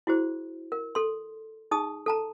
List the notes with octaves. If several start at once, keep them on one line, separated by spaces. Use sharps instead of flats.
E4 F#4 G#4 C5
A#4
A4 C6
D#4 G#4 A5 D#6
A4 A5 A#5